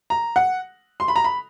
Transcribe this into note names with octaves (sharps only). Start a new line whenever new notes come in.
A#5
F#5
C6
B5
A#5
B5